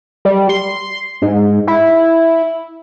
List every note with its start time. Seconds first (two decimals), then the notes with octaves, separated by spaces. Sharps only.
0.25 G3
0.49 C6
1.22 G#2
1.67 E4